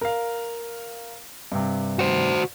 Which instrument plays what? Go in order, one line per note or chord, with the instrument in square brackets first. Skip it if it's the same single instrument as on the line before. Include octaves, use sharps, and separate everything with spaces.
[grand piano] A#4 F5
G2 C3
[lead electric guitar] F#4 C5